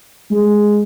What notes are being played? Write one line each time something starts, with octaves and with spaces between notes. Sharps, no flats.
G#3